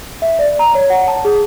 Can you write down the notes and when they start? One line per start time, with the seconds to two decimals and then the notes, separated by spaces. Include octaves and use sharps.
0.22 E5
0.39 D5
0.59 A#5
0.75 C#5
0.90 F#5
1.08 A5
1.25 G#4